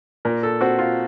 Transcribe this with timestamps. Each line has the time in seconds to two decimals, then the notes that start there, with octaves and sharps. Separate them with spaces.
0.25 A#2 A#4
0.43 A4
0.61 C4 F#4
0.79 F4